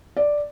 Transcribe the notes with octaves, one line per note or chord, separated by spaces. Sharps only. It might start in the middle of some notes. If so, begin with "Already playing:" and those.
D5